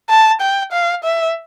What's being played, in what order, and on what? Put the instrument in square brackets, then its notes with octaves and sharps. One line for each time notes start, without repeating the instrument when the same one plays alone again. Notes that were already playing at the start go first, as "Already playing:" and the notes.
[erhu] A5
G5
F5
E5